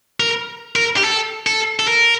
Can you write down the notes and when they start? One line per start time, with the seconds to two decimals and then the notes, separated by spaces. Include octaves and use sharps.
0.20 A#4
0.76 A#4
0.97 G4
1.04 A4
1.47 A4
1.79 A4
1.88 A#4